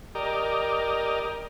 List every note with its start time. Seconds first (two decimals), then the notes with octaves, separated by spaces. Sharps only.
0.15 G4 A#4 D5 D#5